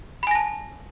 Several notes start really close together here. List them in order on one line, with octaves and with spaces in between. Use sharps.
B5 G#5 A#6 A5